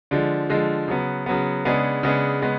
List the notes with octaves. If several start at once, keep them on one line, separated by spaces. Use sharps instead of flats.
D3 F3 G#3
D3 F3 G#3
C#3 F#3 B3
C#3 F#3 B3
C#3 G#3 B3 D4 G#4
C#3 G#3 B3 D4 G#4
C#3 G#3 B3